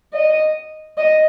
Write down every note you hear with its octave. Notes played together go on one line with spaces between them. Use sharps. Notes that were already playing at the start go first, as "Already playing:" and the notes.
D#5
D#5